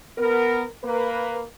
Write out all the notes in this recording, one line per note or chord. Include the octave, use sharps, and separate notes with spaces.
B3 A#4
A#3 B4